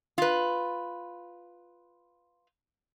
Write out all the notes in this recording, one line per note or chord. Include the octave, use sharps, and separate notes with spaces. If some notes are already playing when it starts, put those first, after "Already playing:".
F4 B4